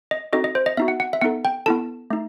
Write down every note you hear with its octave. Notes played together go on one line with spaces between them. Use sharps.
D#5
C4 D#4 F#4 A4 D#5
D#5
C5
D#5
B3 D#4 F#4 E5
F#5
F#5
E5
B3 D#4 A4 F#5
G5
B3 E4 A4 A5
A3 D#4